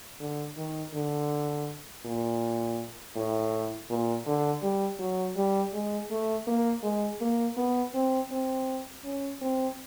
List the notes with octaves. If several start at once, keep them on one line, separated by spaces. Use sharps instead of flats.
D3
D#3
D3
A#2
A2
A#2
D3
G3
F#3
G3
G#3
A3
A#3
G#3
A#3
B3
C4
C4
C#4
C4